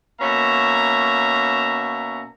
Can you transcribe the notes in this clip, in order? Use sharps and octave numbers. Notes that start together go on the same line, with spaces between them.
B2 A#3 C#4 E5 A#5